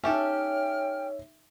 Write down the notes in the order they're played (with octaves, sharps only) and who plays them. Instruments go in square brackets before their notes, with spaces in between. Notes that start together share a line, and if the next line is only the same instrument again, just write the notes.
[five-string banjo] C#4 G4 A4 [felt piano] D#4 E5 [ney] C#5 [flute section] G5 F6